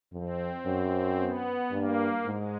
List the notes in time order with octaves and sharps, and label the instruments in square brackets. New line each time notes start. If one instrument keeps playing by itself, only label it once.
[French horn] F2 [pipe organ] C4
[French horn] F#2
[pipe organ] B3
[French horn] G2 [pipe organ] A#3
[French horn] G#2 [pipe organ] G#3